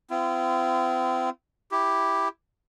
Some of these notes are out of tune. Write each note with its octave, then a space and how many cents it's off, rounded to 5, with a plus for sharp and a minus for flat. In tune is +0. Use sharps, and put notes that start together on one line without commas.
C4 -35 F4 -45
E4 +0 G4 +0